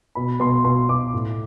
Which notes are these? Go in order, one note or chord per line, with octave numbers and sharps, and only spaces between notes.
B2 B5
B2 C6
B2 C6
B2 D6
A2